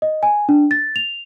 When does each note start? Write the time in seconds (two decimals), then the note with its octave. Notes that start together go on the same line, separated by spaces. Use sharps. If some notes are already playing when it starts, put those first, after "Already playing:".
0.02 D#5
0.23 G#5
0.49 D4
0.71 A6
0.96 F7